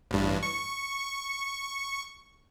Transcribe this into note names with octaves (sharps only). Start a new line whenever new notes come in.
A1 G2
C#6